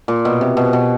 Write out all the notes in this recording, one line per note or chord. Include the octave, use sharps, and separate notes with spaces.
A#2
B2
C3
B2
B2